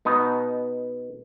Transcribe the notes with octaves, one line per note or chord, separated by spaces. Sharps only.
B2 B3 D#4